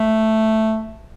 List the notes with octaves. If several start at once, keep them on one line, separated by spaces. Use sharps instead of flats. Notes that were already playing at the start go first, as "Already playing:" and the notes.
Already playing: A3